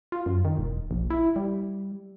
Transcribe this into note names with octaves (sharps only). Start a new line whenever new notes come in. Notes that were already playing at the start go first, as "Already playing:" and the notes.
F4
F#2
D#3
E1
A#1
E4
G3